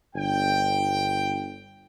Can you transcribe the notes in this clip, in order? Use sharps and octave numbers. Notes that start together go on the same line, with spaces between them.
G1 G5